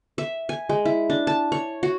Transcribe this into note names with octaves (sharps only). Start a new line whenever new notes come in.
E5
G#5
G#3
E4
D4
A5
C#5
F#4